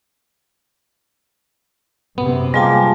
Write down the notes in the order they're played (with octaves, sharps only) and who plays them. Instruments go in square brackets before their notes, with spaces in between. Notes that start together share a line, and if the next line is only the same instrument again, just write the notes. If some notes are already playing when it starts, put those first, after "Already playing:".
[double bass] F#2 C3 [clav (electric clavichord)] B3
[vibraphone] G3 F4 A5 [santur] G#3 A#3 G4